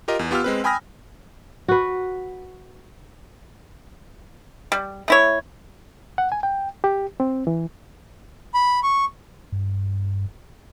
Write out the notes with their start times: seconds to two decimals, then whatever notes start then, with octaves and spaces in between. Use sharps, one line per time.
0.08 F4 G4 A#4 D#5
0.19 E2
0.31 B3 F4 G4 G5 E6 F6
0.44 G#3 C4 B4
0.64 G5 G#5 B5 D#6 F6 A#6
1.68 F#4 B4
4.72 G3
5.08 A3 E4 C#5
6.18 F#5
6.32 G#5
6.43 G5
6.84 G4
7.20 C4
7.47 E3
8.54 B5
8.83 C#6
9.52 G2